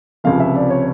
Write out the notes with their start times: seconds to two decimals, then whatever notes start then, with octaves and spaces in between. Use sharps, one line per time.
0.24 C#2 C3 F3 F5
0.40 E5
0.56 D5
0.70 C#5